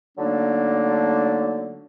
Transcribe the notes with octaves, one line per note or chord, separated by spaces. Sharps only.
D3 F#3 A3 A#3 D4 D#4